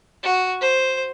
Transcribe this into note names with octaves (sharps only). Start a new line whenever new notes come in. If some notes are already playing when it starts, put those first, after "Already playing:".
F#4
C5